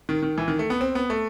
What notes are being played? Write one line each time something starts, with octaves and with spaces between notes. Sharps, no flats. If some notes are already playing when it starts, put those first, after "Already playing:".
D#3
D#3
E3
D#3
A3
B3
C4
B3
A3